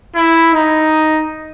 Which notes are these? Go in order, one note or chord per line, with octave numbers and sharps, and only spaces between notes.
E4
D#4